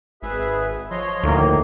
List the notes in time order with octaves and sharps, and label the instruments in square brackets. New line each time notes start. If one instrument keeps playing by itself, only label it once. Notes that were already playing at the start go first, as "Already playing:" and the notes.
[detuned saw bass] G#1 [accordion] G#4 B4 E5
[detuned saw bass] F3 [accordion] C#5 D#5 C6
[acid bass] D2 [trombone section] A2 D#3 A#3